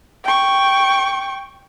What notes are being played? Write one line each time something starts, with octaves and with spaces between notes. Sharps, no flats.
G5 C#6